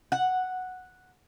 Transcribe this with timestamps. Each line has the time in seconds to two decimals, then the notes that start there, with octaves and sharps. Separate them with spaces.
0.12 F#5